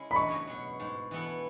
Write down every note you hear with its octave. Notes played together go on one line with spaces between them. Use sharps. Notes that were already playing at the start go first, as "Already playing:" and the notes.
Already playing: C#3 G#3 C#4 E4
B5
E2 C#6
B2 F#3
G#2
E3 B3 E4 A4